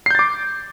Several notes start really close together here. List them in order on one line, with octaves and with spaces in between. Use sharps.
C7 G6 A6 D6